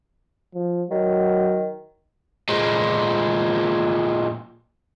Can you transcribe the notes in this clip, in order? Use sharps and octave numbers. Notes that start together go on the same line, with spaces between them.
F3
D#3 F#3
A#2 G#3